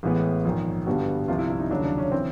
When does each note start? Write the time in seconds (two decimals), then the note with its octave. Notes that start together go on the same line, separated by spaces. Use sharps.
0.03 A1 A2 E3 G#3 B3
0.45 A#1 G#2 D#3
0.86 G2 D3 G3 B3 F#4
1.28 C2 C3 F3 F4
1.39 E4
1.50 E4
1.60 D#4
1.71 D#2 C#3 F#3 D4
1.84 D4
1.98 C#4
2.12 E3 C4